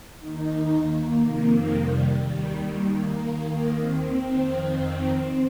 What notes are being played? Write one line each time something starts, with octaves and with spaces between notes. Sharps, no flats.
D#2 D#3 D#4
A#3
F2 C3 D#3
G3
D#2 D#3 G3
A#3
D#2 D#3
C4
F2 D#3